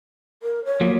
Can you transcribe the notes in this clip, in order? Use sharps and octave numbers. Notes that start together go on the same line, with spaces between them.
A#4
C#5
F3 F#3 A#3